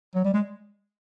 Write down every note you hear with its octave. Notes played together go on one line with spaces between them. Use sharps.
F#3
G3
G#3